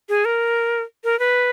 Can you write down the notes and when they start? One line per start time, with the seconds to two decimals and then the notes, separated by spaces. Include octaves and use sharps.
0.09 G#4
0.25 A#4
1.04 A#4
1.19 B4